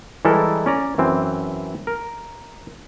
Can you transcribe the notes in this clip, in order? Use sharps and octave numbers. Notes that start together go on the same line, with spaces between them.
E3 G3 G#3 E4 A4 A#4
C#4 D5 A#5
F#2 E3 C4
A#4